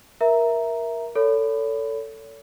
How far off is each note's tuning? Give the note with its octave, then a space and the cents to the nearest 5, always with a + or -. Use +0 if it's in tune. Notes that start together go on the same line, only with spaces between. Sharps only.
A#4 +15 E5 +0 A#5 +0
A4 +20 C#5 +35 B5 +20